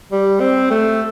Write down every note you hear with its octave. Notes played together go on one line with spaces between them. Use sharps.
G3
C4
A3